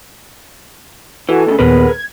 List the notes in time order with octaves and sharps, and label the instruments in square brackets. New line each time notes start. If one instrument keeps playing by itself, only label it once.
[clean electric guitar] E3 [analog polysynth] F#4 A4 G#5
[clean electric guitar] D2 A#2 C#3 [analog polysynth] A4 D#5
[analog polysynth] D#2 A#2 B3 [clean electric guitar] G#4 A#4 B4
[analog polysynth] G#6